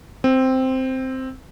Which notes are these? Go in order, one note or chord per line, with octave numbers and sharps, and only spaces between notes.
C4